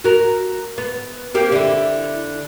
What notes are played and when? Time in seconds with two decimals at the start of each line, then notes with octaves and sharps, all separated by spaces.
0.04 F#4 A#4
0.78 B3
1.34 A#3 C4 G4
1.52 D3 E4